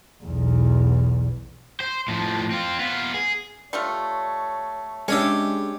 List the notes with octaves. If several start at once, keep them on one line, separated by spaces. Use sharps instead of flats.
B1 E2
C5
A2 F3
C4 F4
B3 F4
G#4
G3 A3 F4 C#5
G#3 C#4 D4 G4 C#5 E5 G#5